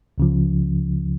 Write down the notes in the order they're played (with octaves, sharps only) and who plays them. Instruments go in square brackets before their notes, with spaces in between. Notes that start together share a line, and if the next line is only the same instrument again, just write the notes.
[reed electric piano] C#2 C#3 F3